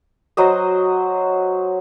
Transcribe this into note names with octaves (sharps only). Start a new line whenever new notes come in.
F#3 C5 D#5